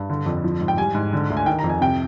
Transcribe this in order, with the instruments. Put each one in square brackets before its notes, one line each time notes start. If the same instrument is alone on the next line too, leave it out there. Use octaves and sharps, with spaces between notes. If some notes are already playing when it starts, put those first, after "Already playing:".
Already playing: [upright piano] G2
D3
F2
F3
G#2
G5
G3 G#5
G#2
D3
D2
G#5
D#3 G5
A#5
F2
G#5
C3 G5